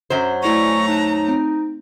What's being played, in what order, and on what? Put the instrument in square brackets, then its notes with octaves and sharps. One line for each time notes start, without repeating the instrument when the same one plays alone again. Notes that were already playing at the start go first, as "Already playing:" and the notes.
[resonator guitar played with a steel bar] F#2 F#3 C5
[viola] A3 A#5 [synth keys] E4 D5 G#5 [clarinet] C#6
[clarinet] D#4 [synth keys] A5 F#6 E7
[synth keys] C4